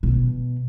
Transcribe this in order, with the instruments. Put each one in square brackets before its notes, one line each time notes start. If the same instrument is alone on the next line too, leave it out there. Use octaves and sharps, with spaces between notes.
[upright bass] B2